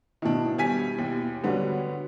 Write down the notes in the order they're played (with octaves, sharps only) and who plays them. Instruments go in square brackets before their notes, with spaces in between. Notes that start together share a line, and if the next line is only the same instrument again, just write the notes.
[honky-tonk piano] B2 E4 [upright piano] D#3 D4
[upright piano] G3 G#5 B6
D#2
[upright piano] D3 B3 [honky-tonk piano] G3 F#4 C#5